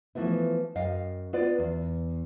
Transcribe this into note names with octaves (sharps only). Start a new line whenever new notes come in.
E3 F3 A3 B3 E4
F#2 D#5 F5 G5
B3 F4 B4 D5
E2